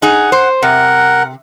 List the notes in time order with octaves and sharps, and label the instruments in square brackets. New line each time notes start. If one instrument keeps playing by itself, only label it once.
[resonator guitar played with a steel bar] D#4 G#4 [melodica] F#5
[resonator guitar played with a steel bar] C5
[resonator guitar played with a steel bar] C3 [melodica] A#4 F#5